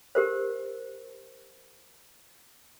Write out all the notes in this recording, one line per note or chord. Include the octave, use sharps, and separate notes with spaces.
G4 A#4 C5